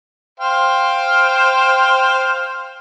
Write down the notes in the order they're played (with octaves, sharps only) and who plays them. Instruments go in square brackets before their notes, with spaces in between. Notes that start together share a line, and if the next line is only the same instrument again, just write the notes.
[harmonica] C5 F5 G5